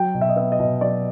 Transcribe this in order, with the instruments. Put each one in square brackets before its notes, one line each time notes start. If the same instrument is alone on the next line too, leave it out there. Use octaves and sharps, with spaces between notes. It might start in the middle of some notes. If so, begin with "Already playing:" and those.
Already playing: [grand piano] F#3 G5
B2
E5
D#5
B3 E5
D#5
B2
F#3 D5